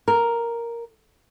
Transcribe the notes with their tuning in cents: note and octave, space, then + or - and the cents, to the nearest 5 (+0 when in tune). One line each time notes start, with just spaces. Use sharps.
A#4 +0